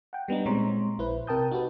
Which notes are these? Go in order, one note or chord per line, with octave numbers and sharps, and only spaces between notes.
F#5 G5
G3 B3 D4 D#4
A#2 G#3 C4 C#5 A#5 C6
A#1 E4 B4 C5
C3 A#4 G5 A5 D#6 G6
D#4 F#4 G4 A4 B4